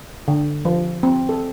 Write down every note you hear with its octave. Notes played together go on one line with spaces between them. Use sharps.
D3
F3
C4
A4